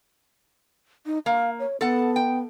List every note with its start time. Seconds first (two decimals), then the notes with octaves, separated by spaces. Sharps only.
1.06 D#4
1.26 A#3 F5
1.59 C#5
1.81 B3 A4 F#5
2.16 G5